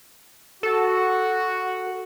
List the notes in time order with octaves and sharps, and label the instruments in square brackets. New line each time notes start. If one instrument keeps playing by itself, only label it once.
[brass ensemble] F#4 [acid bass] A4